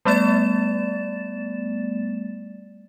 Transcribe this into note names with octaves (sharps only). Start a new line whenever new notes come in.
G3 A3 B3 D5 A6 E7